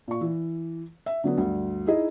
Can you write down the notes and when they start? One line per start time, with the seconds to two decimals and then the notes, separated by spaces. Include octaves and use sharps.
0.08 A#2 C#6
0.21 E3
1.06 E5
1.24 D3 F#3 B3
1.38 D2 G2
1.87 D#4 E4 G#4 D#5